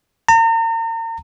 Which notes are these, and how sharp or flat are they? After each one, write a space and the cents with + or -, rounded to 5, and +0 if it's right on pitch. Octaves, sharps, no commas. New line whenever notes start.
A#5 -40